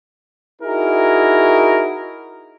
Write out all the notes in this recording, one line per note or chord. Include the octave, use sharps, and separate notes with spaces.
D#4 E4 F#4 G#4 A#4